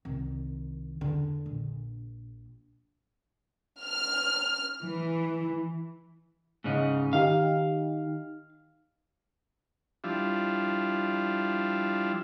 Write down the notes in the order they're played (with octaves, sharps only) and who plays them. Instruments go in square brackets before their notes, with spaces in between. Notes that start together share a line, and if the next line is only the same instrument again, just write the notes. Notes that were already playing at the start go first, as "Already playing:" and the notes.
[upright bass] C2 D#3
E2 D3
A#1
[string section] F6
E3
[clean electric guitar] G#2 C#3 D#4
[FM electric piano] D#3 D#4 G4 [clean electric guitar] F5
[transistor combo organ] F3 G3 D4 E4 F4